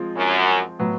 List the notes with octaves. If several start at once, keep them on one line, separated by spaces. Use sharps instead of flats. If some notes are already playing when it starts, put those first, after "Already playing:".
Already playing: F3 G#3 C4 F4
F#2
A2 F#3 B3